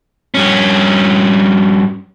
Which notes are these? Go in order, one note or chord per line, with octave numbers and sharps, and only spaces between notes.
G2 C#4